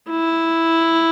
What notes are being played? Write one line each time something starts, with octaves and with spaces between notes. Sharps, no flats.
E4